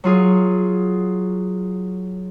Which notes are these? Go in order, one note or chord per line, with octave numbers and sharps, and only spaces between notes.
F#3 F4 G#4